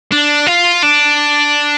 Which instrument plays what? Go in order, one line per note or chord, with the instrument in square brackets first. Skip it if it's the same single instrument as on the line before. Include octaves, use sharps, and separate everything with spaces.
[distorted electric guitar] D4
F4
D4